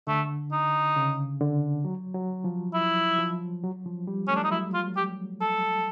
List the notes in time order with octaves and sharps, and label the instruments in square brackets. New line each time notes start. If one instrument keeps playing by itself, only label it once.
[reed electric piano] D3 [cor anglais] A3
[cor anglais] D#4
[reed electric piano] C#3
D3
F#3
F#3
F3
[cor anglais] E4
[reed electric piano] F3
F#3
F3
G3
[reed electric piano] A3 [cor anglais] C#4
[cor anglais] D4
D#4
[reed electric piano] F#3 [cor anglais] E4
[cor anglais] F4
G4
A4